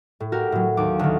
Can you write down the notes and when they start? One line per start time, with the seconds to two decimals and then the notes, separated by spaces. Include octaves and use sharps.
0.20 A2
0.32 F#4 G4 A#4
0.52 A2 F#3
0.77 D#2 D6
0.99 D2 D#3